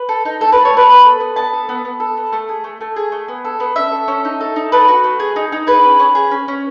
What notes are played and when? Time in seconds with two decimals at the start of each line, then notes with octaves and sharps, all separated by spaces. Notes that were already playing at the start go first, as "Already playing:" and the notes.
Already playing: B4
0.09 A4
0.25 D#4
0.41 A3 A4
0.52 A4 B4
0.65 C#5
0.73 A3 B4
0.88 B3
1.05 A4
1.20 B3
1.36 B3 A5
1.53 A4
1.69 B3
1.85 B3
2.00 A4
2.17 B3
2.32 A3
2.49 G#4
2.64 A3
2.81 A3
2.96 G#4
3.12 A3
3.28 B3
3.45 A4
3.60 B3
3.76 C#4 E5
3.92 A4
4.08 C#4
4.25 D#4
4.41 A4
4.56 D#4
4.72 A4 B4
4.88 F#4
5.04 A3
5.20 G#4
5.36 D#4
5.52 D#4
5.67 G#4 B4
5.84 C#4
5.99 C#4
6.15 G#4
6.31 C#4
6.48 C#4